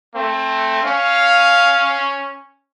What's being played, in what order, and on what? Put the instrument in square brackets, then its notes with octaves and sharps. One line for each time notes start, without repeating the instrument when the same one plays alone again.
[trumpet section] A3 C4
[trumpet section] C#4 [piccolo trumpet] F5